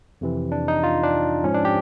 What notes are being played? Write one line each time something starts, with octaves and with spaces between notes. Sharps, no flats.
F2 C3 E3
D4
D#4
F4
D4
G#2 F3 C#4
D4
G4